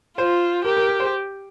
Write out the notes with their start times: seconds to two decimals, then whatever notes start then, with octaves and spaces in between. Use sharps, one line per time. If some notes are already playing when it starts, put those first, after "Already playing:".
0.17 F4 C5
0.64 G4 A#4
0.77 A#4
0.89 A#4
1.00 C5